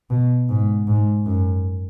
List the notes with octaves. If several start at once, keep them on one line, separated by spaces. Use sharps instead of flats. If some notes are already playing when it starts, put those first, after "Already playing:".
B2
G#2
G#2
F#2